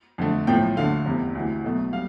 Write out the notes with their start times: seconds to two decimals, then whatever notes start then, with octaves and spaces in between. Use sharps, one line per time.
0.18 F2 D3 A3
0.47 B1 A2 F3 A3 G5
0.77 D2 D3 A3 F5
1.06 F1 E2 C3
1.35 D2 C3 E3
1.64 B1 B2 A3
1.93 G3 F5